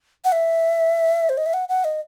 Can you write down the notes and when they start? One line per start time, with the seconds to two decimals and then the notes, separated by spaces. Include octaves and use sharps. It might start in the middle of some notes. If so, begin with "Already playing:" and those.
0.25 F#5
0.32 E5
1.29 C5
1.38 D#5
1.46 E5
1.54 F#5
1.69 F#5
1.84 D#5